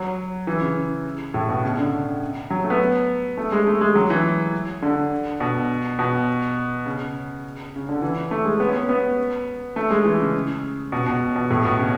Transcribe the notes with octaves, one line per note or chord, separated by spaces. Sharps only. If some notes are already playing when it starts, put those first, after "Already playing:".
Already playing: F#3
E3
C#3
A2
B2
C#3
D3
F#3
A3
B3
A3
G#3
A3
G#3
F#3
E3
D3
B2
B2
C#3
C#3
D3
E3
A3
G#3
B3
C#4
B3
B3
A3
G#3
E3
C#3
B2
B2
B2
A2
B2
C#3